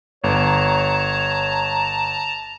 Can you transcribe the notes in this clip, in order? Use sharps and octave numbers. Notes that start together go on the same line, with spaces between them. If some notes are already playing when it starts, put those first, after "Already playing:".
G1 C#5 A5 A#5